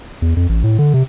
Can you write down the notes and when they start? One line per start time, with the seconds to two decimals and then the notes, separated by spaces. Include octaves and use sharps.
0.22 E2
0.37 F2
0.49 A1
0.64 A2
0.79 D3
0.94 C3